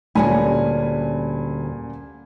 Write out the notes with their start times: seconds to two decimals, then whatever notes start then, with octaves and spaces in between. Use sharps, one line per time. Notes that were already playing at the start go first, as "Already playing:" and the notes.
0.15 D2 A#2 G3 C#4 G#5 B5